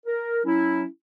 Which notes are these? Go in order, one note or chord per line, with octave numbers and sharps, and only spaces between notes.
A#4
F#3 C#4 E4